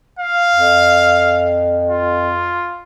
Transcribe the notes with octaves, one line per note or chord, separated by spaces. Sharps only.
F5
F2
F4